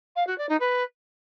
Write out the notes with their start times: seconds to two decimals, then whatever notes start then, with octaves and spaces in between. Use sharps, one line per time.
0.16 F5
0.27 F#4
0.38 D5
0.49 D#4
0.60 B4